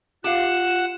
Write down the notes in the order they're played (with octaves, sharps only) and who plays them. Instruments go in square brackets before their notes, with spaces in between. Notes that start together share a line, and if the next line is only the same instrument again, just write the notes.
[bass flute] F4 [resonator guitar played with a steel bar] G4 F5 [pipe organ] F#5 [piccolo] E7